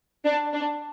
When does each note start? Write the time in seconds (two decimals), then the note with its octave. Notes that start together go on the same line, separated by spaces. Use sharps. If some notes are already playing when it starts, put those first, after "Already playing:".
0.24 D4
0.54 D4